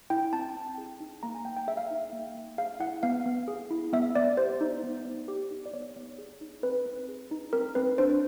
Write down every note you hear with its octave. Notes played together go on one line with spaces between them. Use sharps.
E4 G5
C4 A5
C4
G#4
D#4
A#3 A#5
G#5
A#3 G5
G5
G#4 E5
F5
D#4 E5
A#3
A#3
G#4 F5
E4 F#5
B3 F5
B3
G#4
E4
B3 E5
B3 D5
G4 C5
D#4
B3
B3
G4
D#4
D5
B3 C#5
B3
G#4
D#4
C4 B4
C4
G#4
D#4
C4 A#4
C4 B4
D4 C5